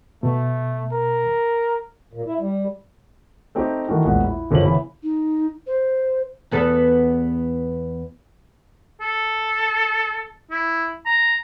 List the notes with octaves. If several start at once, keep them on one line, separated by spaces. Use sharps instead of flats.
B2 A3
A#4
A#2
E4
G3
A3 C4 D#4 G4
D#3 E3 A3 D4 F#4 A4
A#1 E2 A2 G#3 F#5
E4
F#1 D3 F3 C#4 C5 F#7
C#3 E3 B3 E4 B5
D#4
C5
E2 B3 A4
A4
E4
A#5